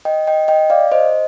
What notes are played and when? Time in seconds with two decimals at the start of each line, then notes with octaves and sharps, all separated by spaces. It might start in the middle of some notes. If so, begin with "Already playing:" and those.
0.05 D#5 G5
0.27 D#5 G5
0.48 D#5 G5
0.70 D5 F5
0.92 C5 D#5